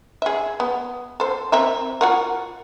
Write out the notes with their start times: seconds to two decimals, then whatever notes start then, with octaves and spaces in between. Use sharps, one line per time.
0.22 G#4 E5
0.60 B3
1.20 A4 C5
1.52 C4 A#4 E5
2.01 F4 F#4 A#4